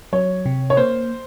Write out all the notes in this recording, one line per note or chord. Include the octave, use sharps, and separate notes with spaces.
F#3 C#5
C3
C#5
A#3 C5